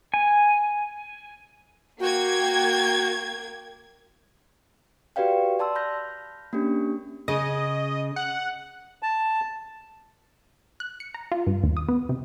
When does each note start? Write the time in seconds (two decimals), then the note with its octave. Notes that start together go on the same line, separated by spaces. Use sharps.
0.14 G#5
2.00 A#3 F#4 G5 G#6
5.16 F#4 G4 B4 D5 F5 G5
5.59 D5 A5 C6 E6
5.75 B5 F6 G6 A#6
6.53 A#3 C#4 D4 G4
7.28 C#3 D#5
8.16 F#5
9.03 A5
10.80 F#6
11.00 C#7
11.14 A#5
11.32 F4
11.47 G2
11.63 D#2
11.77 D#6
11.89 B3
12.09 C3